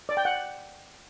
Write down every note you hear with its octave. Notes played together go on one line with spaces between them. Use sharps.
D5
G5
F#5